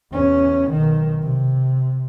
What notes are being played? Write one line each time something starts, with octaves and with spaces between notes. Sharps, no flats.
E2 C#4
B1 D#3
C3